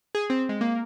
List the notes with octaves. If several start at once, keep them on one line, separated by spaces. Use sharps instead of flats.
G#4
C4
G#3
A#3